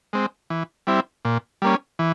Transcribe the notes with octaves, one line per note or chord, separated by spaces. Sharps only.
G#3 C4
E3
G3 C4 E4
A#2
G3 A#3 C#4
E3